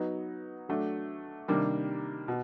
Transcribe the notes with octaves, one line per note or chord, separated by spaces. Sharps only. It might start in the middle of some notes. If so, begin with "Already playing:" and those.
Already playing: F#3 B3 D#4
F#3 A3 D4
C3 D#3 G3 A#3 D4
B2